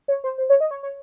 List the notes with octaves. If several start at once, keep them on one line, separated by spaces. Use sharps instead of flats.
C#5
C5
C5
C#5
D#5
C#5
C#5